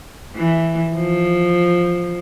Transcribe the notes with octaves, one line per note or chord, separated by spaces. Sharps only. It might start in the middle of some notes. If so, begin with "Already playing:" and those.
E3
F3